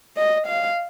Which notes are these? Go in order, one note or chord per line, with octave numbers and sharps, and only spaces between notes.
D#5
F5